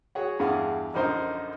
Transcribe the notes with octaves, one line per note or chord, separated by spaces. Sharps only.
F#4 G#4 C#5 F#5
E2 G2 G#4 F5 F#5
A#1 F#2 D3 D#4 A#4 C5